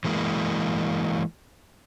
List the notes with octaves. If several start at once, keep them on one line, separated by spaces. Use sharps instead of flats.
E3 G#3 A#3